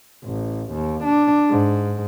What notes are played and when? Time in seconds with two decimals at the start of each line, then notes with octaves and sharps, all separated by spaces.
0.25 A1
0.72 D#2
1.04 D4
1.50 G#2